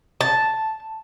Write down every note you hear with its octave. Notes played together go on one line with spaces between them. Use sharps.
A5